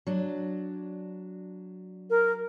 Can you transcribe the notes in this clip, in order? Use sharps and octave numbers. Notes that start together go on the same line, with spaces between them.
F#3 D4
A#4